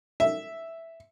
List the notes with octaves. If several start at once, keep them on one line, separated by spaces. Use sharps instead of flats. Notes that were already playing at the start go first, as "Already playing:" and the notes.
E5